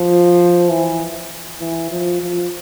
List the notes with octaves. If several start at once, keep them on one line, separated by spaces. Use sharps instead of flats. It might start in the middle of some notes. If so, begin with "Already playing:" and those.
Already playing: F3
E3
E3
F3
F3